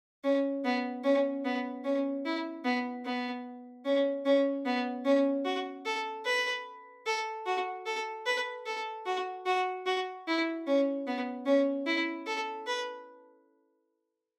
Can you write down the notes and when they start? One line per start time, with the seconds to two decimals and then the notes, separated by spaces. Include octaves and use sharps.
0.24 C#4
0.65 B3
1.04 C#4
1.45 B3
1.84 C#4
2.25 E4
2.65 B3
3.05 B3
3.85 C#4
4.26 C#4
4.66 B3
5.05 C#4
5.45 F#4
5.86 A4
6.25 B4
7.06 A4
7.46 F#4
7.86 A4
8.26 B4
8.66 A4
9.06 F#4
9.46 F#4
9.86 F#4
10.27 E4
10.67 C#4
11.07 B3
11.46 C#4
11.86 E4
12.26 A4
12.67 B4